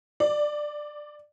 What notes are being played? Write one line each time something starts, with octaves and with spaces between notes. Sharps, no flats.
D5